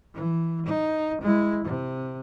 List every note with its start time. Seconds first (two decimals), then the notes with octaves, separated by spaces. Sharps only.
0.14 E3
0.66 D#4
1.21 G#3 E4
1.65 C3